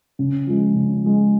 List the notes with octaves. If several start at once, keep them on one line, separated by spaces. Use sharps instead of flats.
C#3
F3 G#3
C#3
F3 G#3